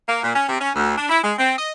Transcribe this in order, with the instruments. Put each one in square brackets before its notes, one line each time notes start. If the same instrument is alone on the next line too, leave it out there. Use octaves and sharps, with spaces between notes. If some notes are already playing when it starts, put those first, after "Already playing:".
[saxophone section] A#3
A#2
C#4
C3
C#4
D2
D4
E4
G#3
C4
D#5